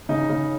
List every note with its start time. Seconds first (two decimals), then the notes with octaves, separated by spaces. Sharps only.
0.09 C#3 D#4
0.29 C#3